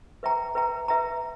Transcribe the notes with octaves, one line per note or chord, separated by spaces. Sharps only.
B4 E5 G5 A#5
B4 E5 G5 A#5
B4 E5 G5 A#5